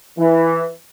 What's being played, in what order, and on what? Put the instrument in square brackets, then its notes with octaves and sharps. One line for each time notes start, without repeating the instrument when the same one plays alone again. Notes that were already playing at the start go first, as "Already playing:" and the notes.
[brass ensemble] E3